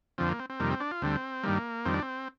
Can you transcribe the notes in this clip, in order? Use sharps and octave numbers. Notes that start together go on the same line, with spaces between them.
F2 D3 F3 C4
A#3
C4
C4
F2 C3 D#3 G3 A#3
C4
D4
F4
D2 D3 G3 C4
G2 D#3 G3 A#3
F2 D#3 G3 C4
D4
C4